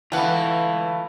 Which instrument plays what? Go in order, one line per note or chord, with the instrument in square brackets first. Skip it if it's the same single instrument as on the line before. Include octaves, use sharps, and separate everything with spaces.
[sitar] E3 [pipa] A3 F#5 [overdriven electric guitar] F4 B4